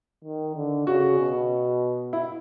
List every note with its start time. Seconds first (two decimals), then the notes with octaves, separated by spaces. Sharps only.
0.24 D#3
0.56 D3
0.87 C#3 F#4
1.19 B2
2.13 E4